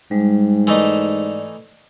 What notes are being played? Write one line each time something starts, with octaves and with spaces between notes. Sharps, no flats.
G#2 G3 G#3
E3 A3 D#4 D5